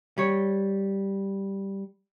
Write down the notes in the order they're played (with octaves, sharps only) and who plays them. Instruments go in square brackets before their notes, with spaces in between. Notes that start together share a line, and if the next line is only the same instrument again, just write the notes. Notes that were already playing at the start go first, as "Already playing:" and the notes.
[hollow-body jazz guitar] G3 C#5